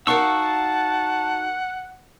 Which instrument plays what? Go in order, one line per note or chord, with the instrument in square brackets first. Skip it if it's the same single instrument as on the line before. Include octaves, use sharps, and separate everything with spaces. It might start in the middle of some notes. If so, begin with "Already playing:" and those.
[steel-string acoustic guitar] D#4 F#4 A#4 [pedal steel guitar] F5 C#6 E6 [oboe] F#5 [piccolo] A5